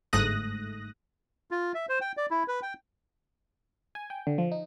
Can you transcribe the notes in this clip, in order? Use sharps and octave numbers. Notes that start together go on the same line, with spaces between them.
G1 G#2 A3 D#6 F#6 A#6
F4
E5
C5
G5
D5
E4
B4
G5
G#5
G5
D3
F3
D#4